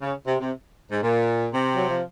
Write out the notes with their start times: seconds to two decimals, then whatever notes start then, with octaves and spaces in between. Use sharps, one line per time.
0.02 C#3
0.27 C3
0.40 C3
0.92 G#2
1.03 A#2
1.54 C3
1.76 F#3
1.90 F3